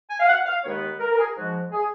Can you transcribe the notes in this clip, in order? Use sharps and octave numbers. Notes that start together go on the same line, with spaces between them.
G#5
F5
F#5
F5
D#2 D#3 G#3 B3 C#5
A#4
A#4
G#4
G#2 F3 G#3 F#4
G#4